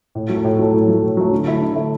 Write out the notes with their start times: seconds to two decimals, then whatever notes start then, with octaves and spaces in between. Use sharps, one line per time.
0.15 A2
0.29 F#3 A3
0.44 A2
0.59 F#3 A3
0.73 A2
0.88 F#3 A3
1.03 A2
1.17 F#3 A3
1.32 D3
1.46 A3 E4
1.61 D3
1.75 A3 E4